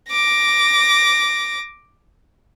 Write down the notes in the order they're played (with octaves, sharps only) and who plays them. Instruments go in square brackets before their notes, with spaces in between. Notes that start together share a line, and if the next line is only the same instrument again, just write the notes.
[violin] D6 A#6